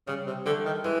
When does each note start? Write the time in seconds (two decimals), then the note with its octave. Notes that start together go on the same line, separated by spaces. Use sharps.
0.07 C#3 G3
0.26 C3
0.45 D3 G3 A3
0.65 D#3
0.84 E3 G#3